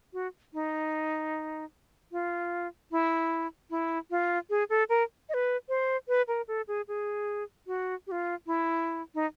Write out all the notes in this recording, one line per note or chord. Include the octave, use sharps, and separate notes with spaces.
F#4
D#4
F4
E4
E4
F4
G#4
A4
A#4
D#5
B4
C5
B4
A#4
A4
G#4
G#4
F#4
G4
F4
E4
D#4